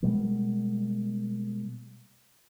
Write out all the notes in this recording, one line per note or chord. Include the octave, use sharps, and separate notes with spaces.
B2 G3 G#3 A#3